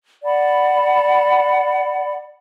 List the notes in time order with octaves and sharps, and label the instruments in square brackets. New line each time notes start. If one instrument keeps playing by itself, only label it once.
[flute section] D5 F#5 A5 B5